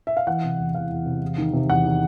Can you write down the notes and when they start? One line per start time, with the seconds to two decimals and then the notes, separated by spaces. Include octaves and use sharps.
0.07 E5
0.17 F5
0.27 E3 F#5
0.43 C3
0.58 E2
0.75 E2 F5
0.91 E2
1.06 C3
1.22 E2
1.38 D#3
1.53 C3
1.70 E2 F#5
1.85 D#3